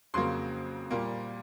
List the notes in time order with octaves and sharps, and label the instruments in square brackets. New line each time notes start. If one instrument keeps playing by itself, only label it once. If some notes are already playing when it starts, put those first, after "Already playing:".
[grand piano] F2 C#3 F#3 A#3 C6
A#2 G3 A#3